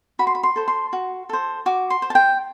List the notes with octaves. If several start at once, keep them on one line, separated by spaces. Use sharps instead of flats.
F#4 B5
C6
B5
C6
A4 C5
C6
F#4
A4 C5
F#4 D6
C6
C5
A5
G5